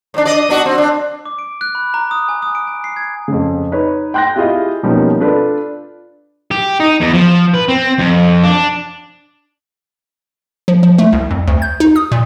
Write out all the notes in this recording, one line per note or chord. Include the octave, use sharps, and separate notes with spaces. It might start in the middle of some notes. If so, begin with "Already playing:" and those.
A2 D4
D5 D#5
B3 D4 F#4
C4
D4
D6
D7
F#6
B5
A#5
D#6
G#5
D#6
D7
G#5
C7
G#6
F2 C#3
D#4 B4 C#5
G5 C6 F#6 G6 A#6
E4 F4 G4 G#4 D#5 F5
B2 F3 G3 A#3 C#4 D#4
D4 F4 A4 B4 D5
G4
D#4
E2
F3
B4
C4
F2
D4
F3
F3
A3
C2
F2
D2
G6
D#4
D#6
A#2